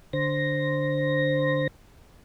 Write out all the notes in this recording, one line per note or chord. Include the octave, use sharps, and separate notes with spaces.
D3 C5 A#6